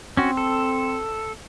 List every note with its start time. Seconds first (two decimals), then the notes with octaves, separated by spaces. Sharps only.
0.17 C4 C#4 F#4
0.37 A4